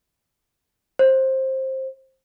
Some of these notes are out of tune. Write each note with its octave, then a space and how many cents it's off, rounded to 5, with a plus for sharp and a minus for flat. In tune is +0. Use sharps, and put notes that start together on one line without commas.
C5 +15